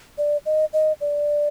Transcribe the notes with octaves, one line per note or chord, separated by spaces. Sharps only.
D5
D#5
D#5
D5